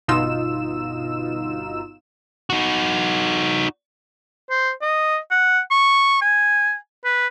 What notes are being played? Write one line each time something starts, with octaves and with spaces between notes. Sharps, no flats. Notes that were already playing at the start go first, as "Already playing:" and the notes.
G1 B2 D#4 F4 E6 E7
D#4 F#4
C5
D#5
F#5
C#6
G#5
B4